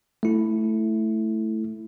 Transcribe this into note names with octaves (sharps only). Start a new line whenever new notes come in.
A3 E4